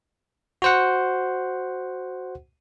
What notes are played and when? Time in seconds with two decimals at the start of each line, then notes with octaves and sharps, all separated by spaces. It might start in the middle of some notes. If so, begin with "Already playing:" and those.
0.62 F#4 C5 F#5